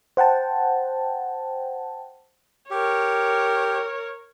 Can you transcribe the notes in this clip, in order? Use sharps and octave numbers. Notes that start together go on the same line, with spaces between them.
C5 F#5 G5 A5
G4 A#4 C#5